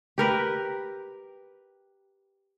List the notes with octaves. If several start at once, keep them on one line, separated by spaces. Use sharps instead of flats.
G4 A#4 B4